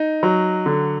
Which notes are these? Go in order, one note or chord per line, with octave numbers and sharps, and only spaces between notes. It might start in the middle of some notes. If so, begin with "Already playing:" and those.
Already playing: D#4
F#3
D3